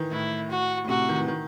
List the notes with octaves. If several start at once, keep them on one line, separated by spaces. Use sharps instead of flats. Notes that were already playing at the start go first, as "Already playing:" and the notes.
Already playing: D#3 E3
A2 E4
F#4
A2
C3 F#4
D#3
E3
D#3